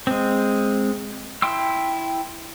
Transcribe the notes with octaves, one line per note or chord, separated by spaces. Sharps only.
G#3 C4
E4 G5 C6 E6